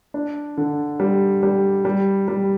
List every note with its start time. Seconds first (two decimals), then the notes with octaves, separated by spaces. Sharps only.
0.14 D4
0.57 D3
1.00 G3
1.43 G3
1.85 G3
2.28 G3